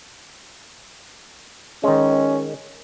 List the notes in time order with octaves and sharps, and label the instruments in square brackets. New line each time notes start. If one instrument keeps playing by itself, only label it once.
[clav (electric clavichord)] D#3 G#3 [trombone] C#4